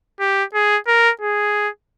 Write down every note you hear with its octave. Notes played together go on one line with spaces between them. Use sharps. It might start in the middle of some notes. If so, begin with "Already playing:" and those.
G4
G#4
A#4
G#4